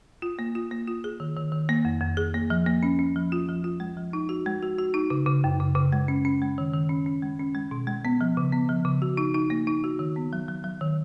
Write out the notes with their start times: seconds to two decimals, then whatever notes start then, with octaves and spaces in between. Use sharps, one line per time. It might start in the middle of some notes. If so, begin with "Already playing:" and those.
0.22 F4
0.39 A#3
0.55 F4
0.71 A#3
0.87 F4
1.04 G#4
1.20 D#3
1.37 D#3
1.52 D#3
1.69 A#3
1.85 F2
2.01 F2
2.17 G#4
2.34 A#3
2.50 F3
2.66 A#3
2.83 C#4
2.99 C#4
3.16 F3
3.32 F4
3.48 F3
3.64 F4
3.80 G#3
3.97 F3
4.13 D#4
4.29 F#4
4.46 G#3
4.63 F#4
4.78 F#4
4.94 D#4
5.10 C#3
5.26 C#3
5.44 F#2
5.60 C#3
5.75 C#3
5.92 G#3
6.08 C#4
6.25 C#4
6.42 G#3
6.58 D#3
6.73 D#3
6.89 C#4
7.06 C#4
7.23 G#3
7.39 C#4
7.55 G#3
7.71 B2
7.87 G#3
8.05 B3
8.21 F3
8.37 C#3
8.53 B3
8.69 F3
8.85 C#3
9.02 F#4
9.17 D#4
9.34 D#4
9.50 A#3
9.67 D#4
9.84 F#4
9.99 D#3
10.16 B3
10.33 F#3
10.49 F#3
10.64 F#3
10.81 D#3